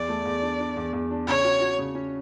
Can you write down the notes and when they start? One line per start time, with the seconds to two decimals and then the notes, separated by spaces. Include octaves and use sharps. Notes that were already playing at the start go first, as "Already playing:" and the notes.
Already playing: E2 D5
0.09 A3
0.25 E2
0.43 D4
0.60 D4
0.77 E2
0.93 E2
1.11 D4
1.27 C#3 C#5
1.44 F#4
1.61 F#4
1.79 C#3
1.95 C#4